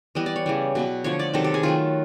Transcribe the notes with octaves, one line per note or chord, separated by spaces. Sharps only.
E3 G3 B3 D#5
D5
C#5
C#3 E3 G3
B2 F#3 B3
D3 F3 A3 C#5
D5
C3 D#3 F#3 A4
G4
G#4
D#3 F#3 A3 F4